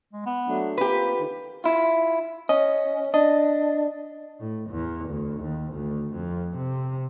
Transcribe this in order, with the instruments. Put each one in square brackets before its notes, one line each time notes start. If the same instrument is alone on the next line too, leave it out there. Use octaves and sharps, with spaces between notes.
[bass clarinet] G#3
B3
[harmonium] F#3 A3 D4
[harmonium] A#3 C4 [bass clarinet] F4 [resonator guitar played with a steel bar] G4 B4
[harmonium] D3 D#3
[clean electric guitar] E4 F4
[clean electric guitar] C#4 [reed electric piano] D#5
[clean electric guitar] D4 [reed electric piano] D#5
[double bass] A2
E2
D2
D#2
D2
F2
C3